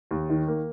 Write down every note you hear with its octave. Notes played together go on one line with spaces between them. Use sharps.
D#2
D#3
A#3